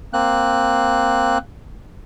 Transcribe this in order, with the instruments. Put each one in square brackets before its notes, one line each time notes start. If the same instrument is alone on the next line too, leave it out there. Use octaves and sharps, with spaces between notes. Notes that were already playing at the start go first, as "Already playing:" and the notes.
[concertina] A#3 C4 F#6